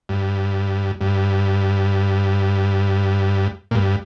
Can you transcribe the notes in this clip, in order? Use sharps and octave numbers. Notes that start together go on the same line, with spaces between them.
G2
G2
A#2
G2